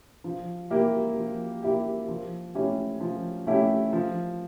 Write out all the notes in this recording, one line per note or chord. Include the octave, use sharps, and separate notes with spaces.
F3
A#3 E4 G4
F3
A#3 E4 G4
F3
A3 C#4 E4 G4
F3
A3 C#4 E4 G4
F3